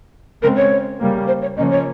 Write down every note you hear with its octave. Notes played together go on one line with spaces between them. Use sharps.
C#3 G#3 C4 A#4
C#5
C#3 G3 A#3
C5
C#5
C#3 F3 A#3 C#4 D#5
C#5